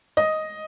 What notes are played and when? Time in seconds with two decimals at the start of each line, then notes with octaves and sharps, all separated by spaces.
0.17 D#5